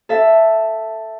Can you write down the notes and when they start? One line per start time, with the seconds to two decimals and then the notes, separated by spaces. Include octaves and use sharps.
0.09 A4 E5